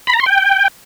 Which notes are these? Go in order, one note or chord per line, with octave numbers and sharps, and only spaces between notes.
B5
A#5
C6
G5